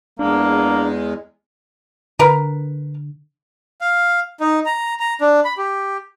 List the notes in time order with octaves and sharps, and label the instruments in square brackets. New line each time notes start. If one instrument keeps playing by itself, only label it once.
[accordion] E2 G#3 [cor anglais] A#3 [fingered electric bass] D4
[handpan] D3 [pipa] A#4 B4
[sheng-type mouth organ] F5
D#4
A#5
A#5
D4
B5
G4